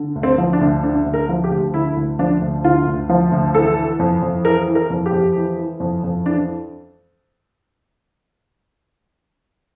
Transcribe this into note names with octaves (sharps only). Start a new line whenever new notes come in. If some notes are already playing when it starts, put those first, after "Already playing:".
Already playing: D3
D2
C4
F3
D4
D2
D3 D4
D2
A#4
F3
G4
D2
D3 E4
D2
F3 D4
D2
D3 F4
D2
F3
D2
E3 A4
E3
F2
F2
E3 A#4
E3
A#4
F2
G4
F2
E3
E3
F2
F2
E3 D4